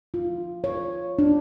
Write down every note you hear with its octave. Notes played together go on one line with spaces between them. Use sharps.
F4
C#5
D4